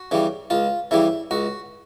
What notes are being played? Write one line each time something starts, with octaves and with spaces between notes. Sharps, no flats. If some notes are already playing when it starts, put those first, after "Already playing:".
Already playing: F#4
C#3 E3 G3
C#2 F4
C#3 E3 G3 E4
C#2 F#4